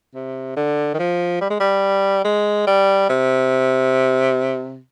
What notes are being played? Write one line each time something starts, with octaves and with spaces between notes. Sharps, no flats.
C3
D3
D#3
F3
G3
G#3
G3
G#3
G3
C3